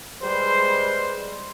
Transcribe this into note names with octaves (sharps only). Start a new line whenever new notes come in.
G3 G#3 B4 C5